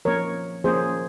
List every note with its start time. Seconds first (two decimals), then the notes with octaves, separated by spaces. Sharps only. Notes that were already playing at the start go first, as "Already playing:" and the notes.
0.05 F3 A#3 C#4 A#4 C#5
0.64 F3 A#3 C#4 G#4 C5